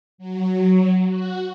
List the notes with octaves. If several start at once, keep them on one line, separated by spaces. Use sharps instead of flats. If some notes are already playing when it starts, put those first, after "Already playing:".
F#3
F#4